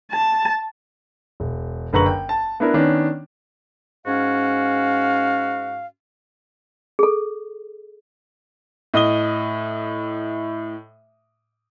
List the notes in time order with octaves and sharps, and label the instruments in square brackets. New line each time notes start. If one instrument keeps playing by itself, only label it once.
[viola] A5
[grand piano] E1
F#1 D3 B4 A#5 C#6 F#7
G5
A5
B3 D4 E4 A#4 B4
D#3 B3 C#4 D4
[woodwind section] G#2 C#4 F#4 F5
[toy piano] G#4 A4
[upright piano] A2 D#5 D#6 G7